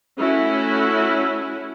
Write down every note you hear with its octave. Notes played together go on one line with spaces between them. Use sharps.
A3 C#4 E4 F#4